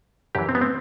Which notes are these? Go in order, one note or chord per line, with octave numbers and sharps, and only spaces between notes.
F#2 E3 G4
C4
B3
C4